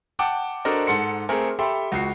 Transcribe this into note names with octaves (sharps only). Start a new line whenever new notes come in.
F#5 G5 A5 D6
D4 F#4 A4 A#4 C5 D#5
G#2 A4 F#5 C6 C#7
A3 C4 G#4 A#4
G4 A4 E5 G5 B5 C6
C#2 F#4 C7